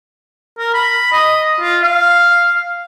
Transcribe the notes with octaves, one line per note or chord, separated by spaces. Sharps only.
A#4
B5
D#5
F4
F5